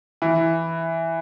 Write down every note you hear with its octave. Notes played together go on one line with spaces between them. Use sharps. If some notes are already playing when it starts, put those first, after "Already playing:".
E3